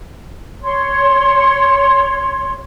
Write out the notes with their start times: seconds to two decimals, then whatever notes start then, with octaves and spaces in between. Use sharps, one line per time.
0.62 C#5 C6